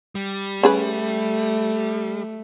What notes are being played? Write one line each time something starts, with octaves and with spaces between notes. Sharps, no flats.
G3
A3 C#4 G#4 B4